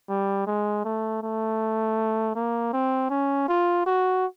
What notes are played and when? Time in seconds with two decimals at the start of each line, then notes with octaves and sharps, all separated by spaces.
0.10 G3
0.47 G#3
0.85 A3
1.23 A3
2.36 A#3
2.73 C4
3.10 C#4
3.49 F4
3.86 F#4